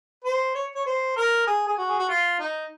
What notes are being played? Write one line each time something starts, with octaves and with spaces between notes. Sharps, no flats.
C5
C#5
C#5
C5
A#4
G#4
G#4
F#4
G#4
F#4
F4
D#4